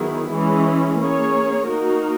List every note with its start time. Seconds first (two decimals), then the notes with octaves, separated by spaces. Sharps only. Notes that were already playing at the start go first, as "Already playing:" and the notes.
Already playing: D#3 F#3 B3 E4 G#4
0.30 E3 G#3 C#4
0.98 A#3 C#4 G#4 C#5
1.66 A#3 D#4 F#4 A#4